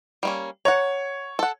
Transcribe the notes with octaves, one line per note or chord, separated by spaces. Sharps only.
G3 A#3 C#4
C#5 F#5 A#5
A4 F#5